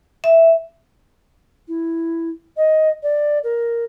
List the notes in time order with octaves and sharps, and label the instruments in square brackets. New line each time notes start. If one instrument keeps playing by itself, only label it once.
[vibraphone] E5
[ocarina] E4
D#5
D5
A#4